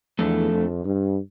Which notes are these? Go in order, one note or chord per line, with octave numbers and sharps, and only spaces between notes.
E2 F3 A3 D4 A4
F2
G2